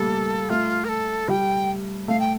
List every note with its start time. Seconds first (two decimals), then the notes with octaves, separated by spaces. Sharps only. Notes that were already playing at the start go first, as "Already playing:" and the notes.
Already playing: G3 A3 A#3 A4
0.49 A3 F4
0.84 A#4
0.89 A4
1.28 G3 G5
2.08 A3 F5
2.20 G5